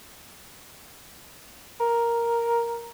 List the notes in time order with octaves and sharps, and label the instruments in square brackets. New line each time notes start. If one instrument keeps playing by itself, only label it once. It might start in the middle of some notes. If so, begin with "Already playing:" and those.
[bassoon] A#4